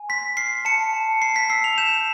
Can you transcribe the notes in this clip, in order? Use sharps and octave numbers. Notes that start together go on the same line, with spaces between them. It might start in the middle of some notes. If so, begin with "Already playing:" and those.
Already playing: G#5
C6 B6
F6 C7
A5 C#7
A5
B5 C7
B6
E6 C7
F7
G6 E7